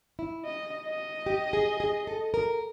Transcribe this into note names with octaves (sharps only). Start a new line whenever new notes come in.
E4
D#5
D#5
G4
G#4
G#4
A4
A#4